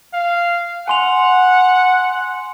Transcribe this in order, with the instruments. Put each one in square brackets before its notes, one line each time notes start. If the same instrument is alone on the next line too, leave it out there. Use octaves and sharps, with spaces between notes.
[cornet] F5
[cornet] F#5 [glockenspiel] G#5 C6 F7